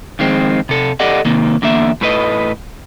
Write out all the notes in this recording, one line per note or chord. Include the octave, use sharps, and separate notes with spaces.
F2 D#3 G#3 C4
C3 A4
G4 A4 D5 D#5 F#5
C3 D#3 A#3
E2 D3 A#3 E5
A2 A3 B4 D#5